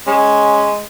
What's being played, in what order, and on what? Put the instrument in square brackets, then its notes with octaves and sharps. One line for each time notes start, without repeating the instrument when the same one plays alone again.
[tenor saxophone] G#3 [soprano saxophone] C#4